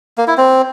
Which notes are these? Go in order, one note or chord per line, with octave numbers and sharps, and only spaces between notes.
A#3
E4
C4